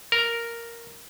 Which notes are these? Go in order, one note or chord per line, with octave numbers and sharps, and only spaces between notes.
A#4